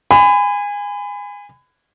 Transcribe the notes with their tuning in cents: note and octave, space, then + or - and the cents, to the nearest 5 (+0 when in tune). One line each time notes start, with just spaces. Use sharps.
G#5 -20 B5 +30